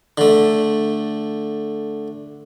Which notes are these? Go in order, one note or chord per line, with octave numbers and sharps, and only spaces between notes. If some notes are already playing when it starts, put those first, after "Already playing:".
D3 A3